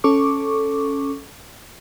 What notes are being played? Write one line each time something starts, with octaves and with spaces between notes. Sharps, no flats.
C#4 A4 C#6 D6